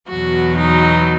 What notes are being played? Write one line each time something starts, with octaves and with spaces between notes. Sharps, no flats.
E2 B2 F#3 F#4
D#4